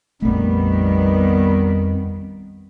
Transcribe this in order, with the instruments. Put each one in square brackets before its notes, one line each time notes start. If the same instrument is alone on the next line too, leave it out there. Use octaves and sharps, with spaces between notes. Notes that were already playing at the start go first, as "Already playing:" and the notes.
[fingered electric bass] A#1 A3 [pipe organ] F2 [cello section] D#3 G3 B3